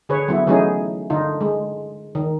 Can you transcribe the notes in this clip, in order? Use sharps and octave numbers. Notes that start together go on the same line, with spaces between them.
D3 G#4 B4 C#5
F#3 B3 E4
E3 F#3 A3 C#4 D#4 G#4
D3 D#4 F4
G#3
D#3